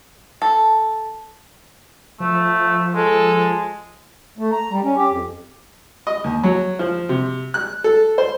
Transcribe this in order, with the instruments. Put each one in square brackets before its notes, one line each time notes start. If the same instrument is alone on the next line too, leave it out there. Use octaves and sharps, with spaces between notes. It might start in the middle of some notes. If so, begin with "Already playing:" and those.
[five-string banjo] A4
[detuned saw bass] F3 [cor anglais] A3
[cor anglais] G#3 [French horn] A4
[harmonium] A3
A#5
G3
C#4
G4
F2
[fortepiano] D#5
D#2
F#3
F3
C3
F#6
A4
C5